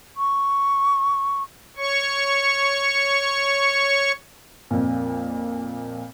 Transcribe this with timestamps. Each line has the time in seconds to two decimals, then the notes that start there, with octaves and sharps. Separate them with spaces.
0.17 C#6
1.77 C#5 C#6
4.71 F2 A#2